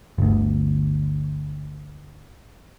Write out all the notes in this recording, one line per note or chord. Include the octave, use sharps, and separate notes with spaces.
G1 D2